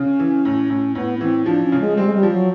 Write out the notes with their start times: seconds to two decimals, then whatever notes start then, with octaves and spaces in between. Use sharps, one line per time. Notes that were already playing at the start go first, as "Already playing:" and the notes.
Already playing: C#3 C#4
0.20 E3
0.45 A2
0.70 A2
0.95 A2 B3
1.17 C#4
1.21 E3 C4
1.46 F3 D4
1.63 C#4
1.72 C#3
1.80 G#3
1.97 G3 C4
2.06 G#3
2.14 G3
2.23 F3
2.31 F#3